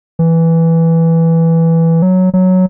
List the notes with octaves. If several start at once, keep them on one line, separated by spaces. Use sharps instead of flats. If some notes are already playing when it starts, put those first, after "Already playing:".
E3
F#3
F#3